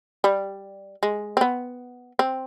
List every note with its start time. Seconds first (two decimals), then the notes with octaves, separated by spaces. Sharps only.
0.24 G3
1.03 G#3
1.37 C4
1.41 B3
2.19 C4